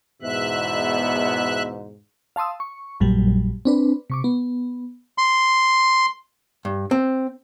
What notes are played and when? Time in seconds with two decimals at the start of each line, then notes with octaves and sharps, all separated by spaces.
0.22 E2 G#2 B2 E5 F#6
2.36 F5 A5 C6 D#6 E6
2.60 C#6
3.00 A#1 F#2 A#2 F#3 G3
3.65 C4 D4 B4
4.10 C3 C#6 D6
4.24 B3
5.18 C6
6.65 G2
6.91 C4